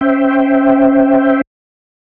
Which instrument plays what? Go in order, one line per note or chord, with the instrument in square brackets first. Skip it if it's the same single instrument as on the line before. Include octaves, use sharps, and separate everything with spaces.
[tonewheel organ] C#4 C5 E5 G5